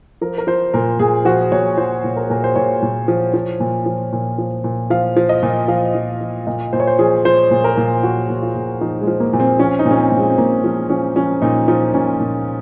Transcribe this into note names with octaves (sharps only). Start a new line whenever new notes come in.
F3 A#4
A#4
F3 C5
A#2 A#4
A#2 G#4
F3 F#4
A#2 C#5
F3 C5
A#2
A#4
A#2 A#4
C5
A#2 C#5
A#2
F3
F3
A#2
F3
A#2
F3
A#2
F3 F5
F3
D#5
A#2
F3 F5
F3
F3
A#2 D#5
A#2 C5
C#5
C5
F3 G#4
F3 C5
A#2
A#4
A#2
F3 F#4
A#2
F4
A#2
F3 D#4
G#3
F3
A#3
A#2
C4
F3 C#4
D#4
A#2
C#4
C4
A#2
G#3
C4
A#2 A#3
F3 C4
F3 C#4
F3 C#4
A#2 D#4
F3 D#4
A#2 C#4
A#2